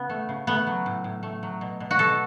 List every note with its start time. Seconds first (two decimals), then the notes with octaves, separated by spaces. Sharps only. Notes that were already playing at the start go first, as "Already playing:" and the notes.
Already playing: C#3 B3
0.10 A3
0.29 C#3
0.47 A3 B3
0.67 F#3
0.86 A2
1.04 A2
1.23 A3
1.43 F#3
1.61 B2
1.80 B2
1.91 F#4
1.98 B2 A4